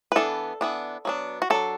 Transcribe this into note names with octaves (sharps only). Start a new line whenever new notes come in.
B4
E3 B3 D4 A4
E3 B3 D4
F#3 B3 D4
F#4
F#3 D4 A4